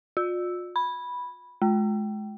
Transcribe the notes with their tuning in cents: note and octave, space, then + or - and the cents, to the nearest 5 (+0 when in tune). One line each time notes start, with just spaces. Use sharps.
F4 +40
B5 -5
G#3 +30